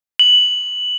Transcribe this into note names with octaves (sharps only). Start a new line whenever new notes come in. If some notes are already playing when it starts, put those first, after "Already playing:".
F#7